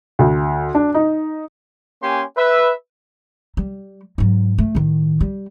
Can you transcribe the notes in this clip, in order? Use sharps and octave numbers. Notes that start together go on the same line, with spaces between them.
D2
D4
D#4
A#3 C#4 G4 G#5 C6
B4 E5
G3
G#2 F#3
A3
A2 D#3
G3